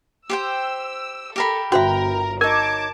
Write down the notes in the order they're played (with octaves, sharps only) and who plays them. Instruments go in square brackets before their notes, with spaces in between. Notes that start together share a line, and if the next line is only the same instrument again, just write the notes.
[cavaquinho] G4 C5 G5 [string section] E6
[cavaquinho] G4 A#4 B5 [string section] A4
[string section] G1 A#4 A#5 [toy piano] F#4 C5 E5 [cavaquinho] G5 B5
[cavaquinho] D#4 C#5 [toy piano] A#4 [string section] A5 D6 [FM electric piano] G#6